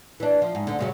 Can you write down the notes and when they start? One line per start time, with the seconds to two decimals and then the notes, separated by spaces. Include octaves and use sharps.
0.20 E3 D4
0.42 F3
0.55 G#2
0.67 D2 D3
0.79 G2 C#3 F#3